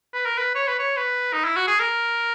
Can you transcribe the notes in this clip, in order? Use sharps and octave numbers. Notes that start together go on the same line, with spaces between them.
B4
A#4
B4
C#5
B4
C#5
B4
D#4
E4
F#4
G#4
A#4